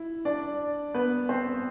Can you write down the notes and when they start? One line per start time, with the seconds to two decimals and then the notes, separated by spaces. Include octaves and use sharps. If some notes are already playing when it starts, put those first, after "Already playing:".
Already playing: E4
0.25 D4 D5
0.94 B3 B4
1.29 C4 C5